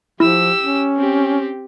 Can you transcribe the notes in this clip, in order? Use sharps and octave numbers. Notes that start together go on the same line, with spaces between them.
F3 E4 G4 E6
C#4
C4 G4